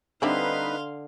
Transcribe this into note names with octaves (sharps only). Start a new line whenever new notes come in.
D3 G3 C4 D#4 E4 B4 F5 C6